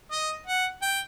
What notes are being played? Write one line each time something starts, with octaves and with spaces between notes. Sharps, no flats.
D#5
F#5
G5